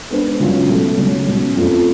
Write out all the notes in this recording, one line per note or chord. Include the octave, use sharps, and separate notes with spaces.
G#3 B3 D4 G#4 B4
C#3 F#3 C#4 F4
B2 F#3 A3
C#3 F#3 C#4
B2 F#3 C#4
F2 F3 A3 F4 A4